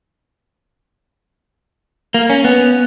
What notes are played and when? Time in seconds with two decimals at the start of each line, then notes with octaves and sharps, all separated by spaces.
2.14 A#3
2.30 C#4
2.45 B3